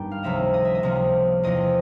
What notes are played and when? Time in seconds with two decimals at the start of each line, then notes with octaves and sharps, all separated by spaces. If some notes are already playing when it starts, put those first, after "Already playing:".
Already playing: G2 D#3 G3 B3 D4 G5
0.11 F5
0.23 C#2 C3 F3 A#3 E5
0.54 D#5
0.65 E5
0.75 D#5
0.83 C#2 C3 F3 A#3
1.43 E2 C3 F3 D#5